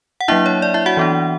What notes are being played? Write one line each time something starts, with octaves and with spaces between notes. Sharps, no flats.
F#5
F#3 A#3 D4 E4 E5
C#5
D5
E4 E5
F#4 F#5
E3 B3 D4